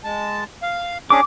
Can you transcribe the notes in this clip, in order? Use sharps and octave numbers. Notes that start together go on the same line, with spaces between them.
G#3 A5
F5
C#4 D4 G#4 D6